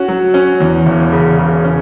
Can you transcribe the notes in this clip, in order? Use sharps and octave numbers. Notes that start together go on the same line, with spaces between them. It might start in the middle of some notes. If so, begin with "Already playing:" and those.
Already playing: C#4 F#4
F#3
C#4
E2
E1
C#3
C#3
C#4